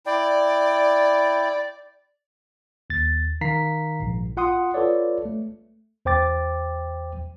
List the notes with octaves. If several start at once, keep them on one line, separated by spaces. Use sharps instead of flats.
E4 D5 G5
D#2 A6
D#3 F5 A#5 B6 C7
A#1 G#2
F4 F#5 C6 D#6
F4 A4 B4 C#5 D5
A3
E2 C5 G5 D6 A6